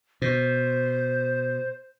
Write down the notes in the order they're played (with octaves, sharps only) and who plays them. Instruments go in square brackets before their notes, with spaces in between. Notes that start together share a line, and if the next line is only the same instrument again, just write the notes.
[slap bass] B2 [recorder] C5